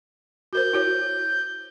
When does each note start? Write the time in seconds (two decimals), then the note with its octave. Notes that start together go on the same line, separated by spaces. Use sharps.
0.53 F#4 A#4 C5 G6
0.73 E4 F#4 C#5